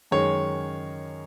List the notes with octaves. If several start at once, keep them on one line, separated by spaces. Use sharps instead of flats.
F#2 D#3 G#3 C#5